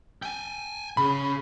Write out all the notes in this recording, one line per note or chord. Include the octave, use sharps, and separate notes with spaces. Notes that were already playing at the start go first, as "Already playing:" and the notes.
G5 G#5
C#3 B5